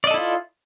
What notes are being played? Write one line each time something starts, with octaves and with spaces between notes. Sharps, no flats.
E4 F4 A4 D5 D#5